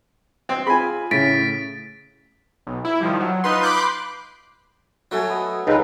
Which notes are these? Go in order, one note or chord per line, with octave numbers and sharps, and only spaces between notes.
C4
F4 G#4 G#5 B5
A2 C#3 A6 B6 D7
B1
E4
D#3 F3 G3
F#3
D#4 F4 B4 C6
B5 C6 D6 F#6 G6
F#3 A3 F#4 A4 G#5
B3 D#5
C#2 G#3 C4 D#4 A4 B4 A#5